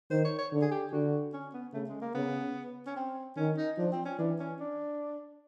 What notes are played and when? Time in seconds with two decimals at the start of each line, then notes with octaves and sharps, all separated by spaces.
0.11 D#3 C5
0.25 C#5
0.38 C#5
0.52 D3
0.62 G#4
0.71 G4
0.92 D3 F#4
1.33 C#4
1.53 B3
1.74 C#3 A3
1.88 G#3
2.01 A#3
2.15 C#3 B3
2.87 C#4
2.96 C4
3.37 D#3 C#4
3.58 D#4
3.78 F3 D4
3.92 C4
4.05 C#4
4.19 E3 D4
4.40 C#4
4.60 D4